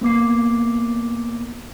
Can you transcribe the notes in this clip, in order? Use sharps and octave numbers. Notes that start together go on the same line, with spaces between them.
A#3 B3 D6 C7